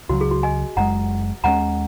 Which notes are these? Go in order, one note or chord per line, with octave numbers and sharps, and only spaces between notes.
C#2 C#3 F#3 F#4
G#4
F#4
D#5 G#5
F#1 F#2 C#3 G#3 F#5 A#5
D#2 D#3 G#3 C#4 F#5 A#5